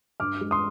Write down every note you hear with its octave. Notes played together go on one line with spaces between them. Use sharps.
G2 D6 F6
G#3
C6 D#6